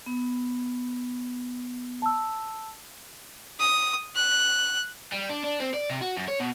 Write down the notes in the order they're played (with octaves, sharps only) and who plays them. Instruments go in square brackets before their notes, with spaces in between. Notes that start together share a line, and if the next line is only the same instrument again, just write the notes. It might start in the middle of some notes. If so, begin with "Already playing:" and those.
[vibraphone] B3
[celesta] A5 E6
[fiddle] D#6
F#6
[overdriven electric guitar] G3
D4
D4
C4
D5
C3
F#4
F#2
C#5
B2